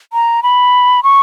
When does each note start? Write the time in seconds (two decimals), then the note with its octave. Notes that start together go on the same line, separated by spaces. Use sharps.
0.13 A#5
0.43 B5
1.03 C#6